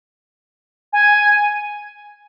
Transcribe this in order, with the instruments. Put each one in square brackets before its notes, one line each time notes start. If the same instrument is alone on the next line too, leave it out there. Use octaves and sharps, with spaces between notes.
[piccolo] G#5